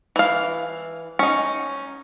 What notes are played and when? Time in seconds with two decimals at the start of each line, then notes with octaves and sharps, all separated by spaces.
0.16 E3 F5
1.19 C#4 D#4